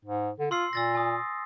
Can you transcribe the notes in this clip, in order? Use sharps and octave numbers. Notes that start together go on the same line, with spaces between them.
G#2
D3
F4 C6 E6 C7
A#2 E6 A6 A#6
G#5 D#6